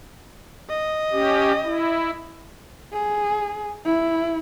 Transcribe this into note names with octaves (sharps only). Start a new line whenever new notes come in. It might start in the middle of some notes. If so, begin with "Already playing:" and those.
D#5
C#4 G4
E4
G#4
E4